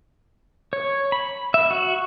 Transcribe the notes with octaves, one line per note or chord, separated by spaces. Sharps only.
C#5
B5
E5
F#4